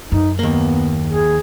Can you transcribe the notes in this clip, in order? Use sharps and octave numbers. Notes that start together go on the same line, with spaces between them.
F#2 D#4
D#2 A#3 B3
G#4